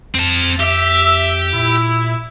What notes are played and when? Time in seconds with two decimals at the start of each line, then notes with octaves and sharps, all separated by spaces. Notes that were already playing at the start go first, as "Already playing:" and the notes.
0.15 F2 C4 A5
0.60 G4 E5
1.54 A#2 E4